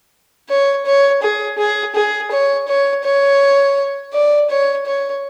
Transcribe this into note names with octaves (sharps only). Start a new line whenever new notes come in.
C#5
C#5
G#4
G#4
G#4
C#5
C#5
C#5
D5
C#5
C#5